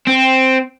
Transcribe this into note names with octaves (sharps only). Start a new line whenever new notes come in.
C4